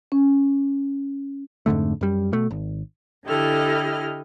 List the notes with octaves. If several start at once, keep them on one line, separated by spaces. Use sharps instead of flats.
C#4
F2 G#2 D3 A3
F#2 G3
B2 A3
G#1
D3 E4 G4 A4 D#5 F6